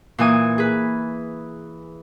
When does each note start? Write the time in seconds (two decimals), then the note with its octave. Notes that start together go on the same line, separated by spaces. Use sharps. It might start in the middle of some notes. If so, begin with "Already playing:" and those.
0.18 A#2 E3 G#5 D#6
0.58 G#4 B4